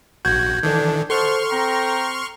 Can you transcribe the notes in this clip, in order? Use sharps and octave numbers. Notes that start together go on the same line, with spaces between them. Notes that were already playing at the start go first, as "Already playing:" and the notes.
A#1 F#4 G6 G#6
D#3 E3 D4 A4
A4 C5 D#5 F#5 A5 C6 C#6 F6
C4 G5 A#5